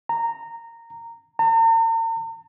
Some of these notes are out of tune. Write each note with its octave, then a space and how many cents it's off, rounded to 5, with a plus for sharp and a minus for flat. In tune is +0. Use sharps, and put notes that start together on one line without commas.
A#5 -15
A#5 -45